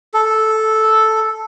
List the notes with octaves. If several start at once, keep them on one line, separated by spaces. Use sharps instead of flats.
A4